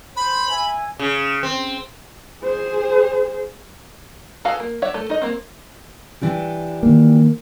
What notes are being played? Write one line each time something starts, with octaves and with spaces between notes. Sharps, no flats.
C5 B5
E5 G#5
C#3
C4
G#4 C5
F#4 G#4 A4 B4 F5
A#3
C#5 D5 E5 F#5
A3 A4
D#4 D#5
A#3 C4
E3 D4 G4
D#3 A#3